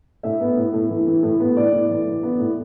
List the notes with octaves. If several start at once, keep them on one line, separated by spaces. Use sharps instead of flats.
A2 E5
B3
A2
A2
E3
E3
A2
B3
A2 D5
A2
E3
E3
B3
A2